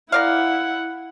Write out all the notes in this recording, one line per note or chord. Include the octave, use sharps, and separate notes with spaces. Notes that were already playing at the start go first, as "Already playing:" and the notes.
E4 A#4 D5 F5 F#5